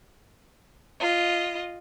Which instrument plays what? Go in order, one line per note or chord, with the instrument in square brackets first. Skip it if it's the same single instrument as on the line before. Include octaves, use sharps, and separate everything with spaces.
[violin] F4 D#5